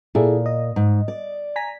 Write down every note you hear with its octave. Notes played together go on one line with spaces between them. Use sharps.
A#2 E4 G#4 A4
D#5
G#2
D5
G#5 A#5 B6